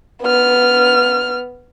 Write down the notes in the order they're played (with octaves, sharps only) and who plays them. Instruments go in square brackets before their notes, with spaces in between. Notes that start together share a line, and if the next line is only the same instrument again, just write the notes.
[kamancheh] B3 F6